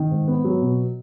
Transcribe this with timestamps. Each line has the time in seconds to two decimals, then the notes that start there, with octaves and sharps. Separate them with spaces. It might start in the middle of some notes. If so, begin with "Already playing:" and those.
Already playing: D#3
0.11 G#2
0.28 B3
0.44 F#3
0.62 B2